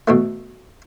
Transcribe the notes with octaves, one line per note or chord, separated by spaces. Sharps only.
B2 E3 A3